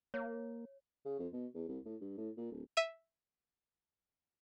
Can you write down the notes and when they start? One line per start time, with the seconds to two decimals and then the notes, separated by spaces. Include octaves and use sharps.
0.14 A#3 C#5
1.05 C#3
1.19 F2
1.33 B2
1.55 E2
1.68 C2
1.85 A2
2.01 G2
2.17 A2
2.37 A#2
2.51 D1
2.77 E5 D#7